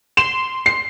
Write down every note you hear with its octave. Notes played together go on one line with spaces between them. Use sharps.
C6 E7
C7